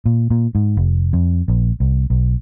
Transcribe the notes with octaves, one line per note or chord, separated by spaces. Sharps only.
A#2
A#2
G#2
F1
F2
A#1
C2
B1